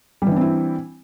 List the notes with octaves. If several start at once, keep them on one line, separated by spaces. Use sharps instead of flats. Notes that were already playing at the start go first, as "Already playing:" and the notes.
E3 G3 C4 D4 E4